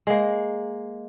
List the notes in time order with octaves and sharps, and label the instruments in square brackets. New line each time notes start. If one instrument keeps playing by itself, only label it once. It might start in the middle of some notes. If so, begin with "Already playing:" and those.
[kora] G#3 A#3